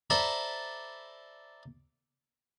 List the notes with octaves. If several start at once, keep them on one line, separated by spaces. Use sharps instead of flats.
A4 C5 D5 E5 A#5 B5